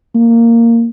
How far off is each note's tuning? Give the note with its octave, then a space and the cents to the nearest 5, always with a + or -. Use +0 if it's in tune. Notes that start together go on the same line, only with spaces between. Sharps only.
A#3 -10